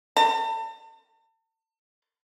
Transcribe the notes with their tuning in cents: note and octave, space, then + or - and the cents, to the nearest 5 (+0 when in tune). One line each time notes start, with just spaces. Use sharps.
A5 +40